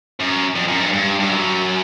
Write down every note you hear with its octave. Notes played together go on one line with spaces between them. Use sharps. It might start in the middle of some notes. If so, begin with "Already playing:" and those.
F#2
F2
F#2
G2
G2
G2
F#2